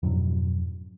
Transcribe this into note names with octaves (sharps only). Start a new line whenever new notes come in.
F2 G#2 B2 F#3